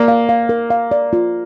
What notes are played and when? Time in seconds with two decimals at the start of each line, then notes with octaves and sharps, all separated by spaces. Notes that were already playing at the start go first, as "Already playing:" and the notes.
Already playing: A#3 D5
0.08 F5
0.29 F5
0.49 A#4
0.70 F5
0.91 D5
1.13 F4